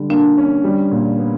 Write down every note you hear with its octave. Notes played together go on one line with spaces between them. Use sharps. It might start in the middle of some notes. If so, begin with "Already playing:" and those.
Already playing: D3 G3
A#3 D4
C#4
G3
A#2
B3